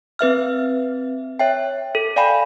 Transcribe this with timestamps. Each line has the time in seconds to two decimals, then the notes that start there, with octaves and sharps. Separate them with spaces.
0.19 C4 B4 E5 F6
1.39 C#5 E5 G5
1.95 A4
2.16 D5 F5 G5 G#5 B5